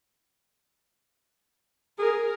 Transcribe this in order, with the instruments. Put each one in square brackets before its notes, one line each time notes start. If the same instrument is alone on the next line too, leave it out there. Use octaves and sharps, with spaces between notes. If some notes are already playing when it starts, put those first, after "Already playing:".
[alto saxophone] G#4 [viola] A#4